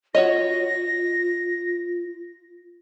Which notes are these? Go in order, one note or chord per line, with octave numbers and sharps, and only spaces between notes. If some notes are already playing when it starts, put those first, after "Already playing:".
F4 F#4 C#5 D#5 A#6